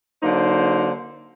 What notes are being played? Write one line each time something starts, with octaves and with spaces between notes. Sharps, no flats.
D3 F#3 A#3 D#4 C5